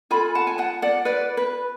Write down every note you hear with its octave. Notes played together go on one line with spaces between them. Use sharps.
F4 A4 G#5 B5
F#5 A5
G#5
F#5 A5
D5 F#5
B4 D5
B4